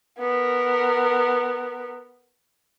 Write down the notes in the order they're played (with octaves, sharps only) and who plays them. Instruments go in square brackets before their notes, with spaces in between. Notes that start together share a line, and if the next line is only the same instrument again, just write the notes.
[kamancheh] B3 A#4